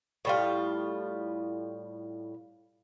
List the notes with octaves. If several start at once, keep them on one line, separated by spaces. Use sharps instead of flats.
A2 G3 F4